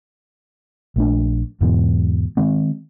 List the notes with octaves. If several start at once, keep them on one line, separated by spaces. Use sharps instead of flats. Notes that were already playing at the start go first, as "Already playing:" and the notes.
A#1 A3 D4
E2 G#2 B2 E3
D#3 G#3 C4